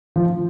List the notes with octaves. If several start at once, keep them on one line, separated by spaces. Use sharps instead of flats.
F3